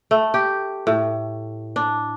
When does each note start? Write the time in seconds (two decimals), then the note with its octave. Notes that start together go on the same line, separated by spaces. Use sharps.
0.11 A3
0.34 G4
0.87 A2
1.76 D4